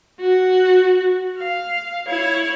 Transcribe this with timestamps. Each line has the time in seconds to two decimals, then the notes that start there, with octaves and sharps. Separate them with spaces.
0.21 F#4
1.39 F5
2.08 E4 C#5